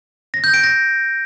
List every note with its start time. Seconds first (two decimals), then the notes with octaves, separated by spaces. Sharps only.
0.34 A#6
0.44 G6
0.54 D7
0.64 A#6